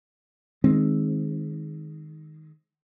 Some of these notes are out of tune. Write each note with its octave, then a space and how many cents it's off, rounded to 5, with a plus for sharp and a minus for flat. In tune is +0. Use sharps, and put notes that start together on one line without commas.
D#3 +0 G#3 +0 C4 +10